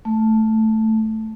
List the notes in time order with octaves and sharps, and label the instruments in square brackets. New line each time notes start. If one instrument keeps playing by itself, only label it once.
[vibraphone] A3